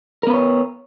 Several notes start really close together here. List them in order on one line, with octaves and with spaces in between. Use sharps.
A#4 B3 B4 C#5